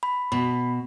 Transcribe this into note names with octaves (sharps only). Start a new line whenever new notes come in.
B5
B2 B5